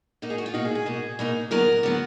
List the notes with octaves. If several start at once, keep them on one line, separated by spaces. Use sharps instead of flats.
B2 A#3 D#4
G#4
F#4
F4
B2 A#3 D#4 F#4
G#4
G#4
B2 A#3 D#4
B2 A#3 D#4
D3 F#3 B3 A#4
D3 F#3 B3